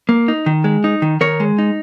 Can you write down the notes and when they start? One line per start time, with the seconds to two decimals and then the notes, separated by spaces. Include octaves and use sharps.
0.09 A#3
0.28 D#4
0.46 D#3
0.64 G#3
0.84 D#4
1.02 D#3
1.21 D#3 A#4 C#5
1.40 G#3
1.58 D#4